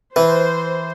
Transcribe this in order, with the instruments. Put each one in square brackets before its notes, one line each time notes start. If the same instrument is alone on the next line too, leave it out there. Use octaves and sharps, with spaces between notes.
[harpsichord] E3 [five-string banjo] B4 [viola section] C5